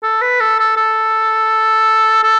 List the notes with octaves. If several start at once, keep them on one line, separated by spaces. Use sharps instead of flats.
A4
B4
A4
A4
A4
A4